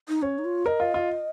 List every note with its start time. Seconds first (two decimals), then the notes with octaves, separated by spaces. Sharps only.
0.09 D#4
0.22 C#4 C#5
0.39 D#4
0.45 F4
0.66 A#4 D#5
0.80 F4
0.94 F4